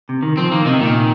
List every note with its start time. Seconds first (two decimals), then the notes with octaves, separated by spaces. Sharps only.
0.09 C3
0.23 D#3
0.37 F3 C4
0.52 D#3 A#3
0.62 A#2
0.66 C3 D#3
0.81 A#2 D#3